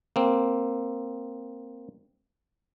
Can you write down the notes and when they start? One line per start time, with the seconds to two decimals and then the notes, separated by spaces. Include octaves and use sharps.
0.16 A#3 C4